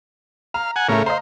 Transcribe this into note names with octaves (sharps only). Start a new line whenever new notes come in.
F5 A#5
F#5 G#5
A2 C#3 A3 C#4 A#4
C5 D#5 F5 A#5